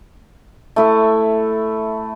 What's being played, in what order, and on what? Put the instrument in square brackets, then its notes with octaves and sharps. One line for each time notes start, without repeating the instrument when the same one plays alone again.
[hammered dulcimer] A3 E4 E5